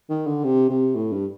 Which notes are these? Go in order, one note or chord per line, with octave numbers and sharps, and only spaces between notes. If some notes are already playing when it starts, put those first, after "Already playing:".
D#3
D3
C3
C3
A2
G2